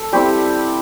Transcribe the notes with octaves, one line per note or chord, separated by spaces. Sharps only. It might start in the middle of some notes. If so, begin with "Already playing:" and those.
Already playing: A4
G3 C4 E4 G4